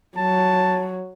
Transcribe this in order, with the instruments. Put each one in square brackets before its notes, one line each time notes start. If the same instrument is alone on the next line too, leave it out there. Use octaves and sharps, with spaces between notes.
[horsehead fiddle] F#3 [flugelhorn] A5